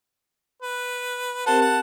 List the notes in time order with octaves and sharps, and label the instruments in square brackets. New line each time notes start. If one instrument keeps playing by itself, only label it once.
[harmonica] B4
[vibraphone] C4 G4 A#4 [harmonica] C5 F#5 [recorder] A5
[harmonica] F#5